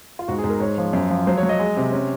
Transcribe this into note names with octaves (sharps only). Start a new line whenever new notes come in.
F4
G#2 F#4
G#4
G#2
A#4
G#2 C#5
F3
F#2
F3
F#3 C5
C#5
F#3
D#5
G#3
C3
C#4